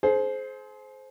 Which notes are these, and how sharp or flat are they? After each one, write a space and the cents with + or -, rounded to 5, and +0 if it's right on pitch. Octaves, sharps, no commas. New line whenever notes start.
G#4 +40 C5 +0